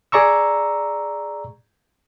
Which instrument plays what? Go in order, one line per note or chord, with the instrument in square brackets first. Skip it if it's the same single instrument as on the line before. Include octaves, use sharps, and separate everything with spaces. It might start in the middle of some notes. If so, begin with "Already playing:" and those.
[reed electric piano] G#4 D5 A#5 C#6 E6